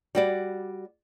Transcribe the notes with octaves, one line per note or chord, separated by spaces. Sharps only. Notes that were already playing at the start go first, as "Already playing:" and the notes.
G3 F#4 D5